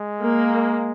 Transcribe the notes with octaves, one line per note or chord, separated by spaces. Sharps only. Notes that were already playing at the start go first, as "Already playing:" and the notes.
Already playing: G#3
A#3